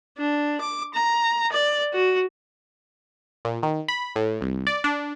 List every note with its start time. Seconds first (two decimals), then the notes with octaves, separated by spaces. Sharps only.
0.18 D4
0.61 D6
0.94 A#5
1.52 D5
1.93 F#4
3.45 A#2
3.63 D#3
3.88 B5
4.16 A2
4.41 C2
4.67 D5
4.84 D4